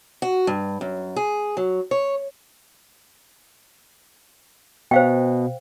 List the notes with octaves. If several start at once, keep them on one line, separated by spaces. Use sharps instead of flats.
F#4
G2
F#2
G#4
F#3
C#5
B2 C5 F5 G5